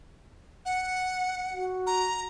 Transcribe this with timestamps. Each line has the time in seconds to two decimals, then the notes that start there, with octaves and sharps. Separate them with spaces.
0.65 F#5
1.53 F#4
1.87 A#5